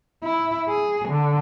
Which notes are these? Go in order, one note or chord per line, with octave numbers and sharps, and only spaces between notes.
E4
G#4
D3